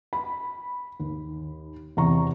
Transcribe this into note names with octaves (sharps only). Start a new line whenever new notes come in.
B5
D#2
E2 C3 A#5 C#6